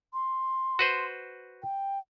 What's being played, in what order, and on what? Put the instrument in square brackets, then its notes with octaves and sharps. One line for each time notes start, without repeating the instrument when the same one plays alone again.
[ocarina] C6
[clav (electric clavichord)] F#4 B4 C5
[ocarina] G5